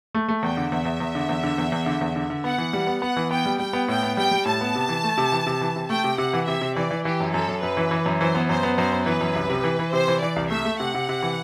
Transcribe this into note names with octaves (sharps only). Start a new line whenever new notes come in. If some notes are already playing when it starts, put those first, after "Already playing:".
A3
A3
E2 G5
D3
E2 E5
E2
E2
D3
E2
D3
E2
E2
D3
E2
D3
D3
B3 F#5
E3
G3
B3
B3 F#5
E3
B3 G5
G3
G3 G5
B3
A2 G5
B3
G3 G5
G3
A2 A5
B3
C3
E3
A3
C3
E3
C3
E3
C3
A3 G5
C3
C3 F#5
E3
C3 E5
C3
E3 D5
E3
E3 G4
F#2
F#2 A4
F#2
F#2 B4
E3
E3
F#2
E3 C5
B3
F#2 C5
B3
F#2 C5
B3
E3 B4
F#2
C2
C3
E3
E3
C3 C5
E3
E3 D5
C2
A3 E5
A3
C3 F#5
C3
C3
E3